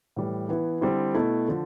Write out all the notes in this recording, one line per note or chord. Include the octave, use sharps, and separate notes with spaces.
A2 E3 G3
E3 B3 E4
D3 G3 C4 E4
B2 A3 E4 A4
D3 F3